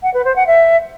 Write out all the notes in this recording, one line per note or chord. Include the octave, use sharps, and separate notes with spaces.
F#5
B4
C5
F#5
E5